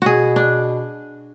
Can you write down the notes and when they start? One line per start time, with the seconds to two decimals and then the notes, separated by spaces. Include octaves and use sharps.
0.02 B2 F#4 G#4
0.36 D4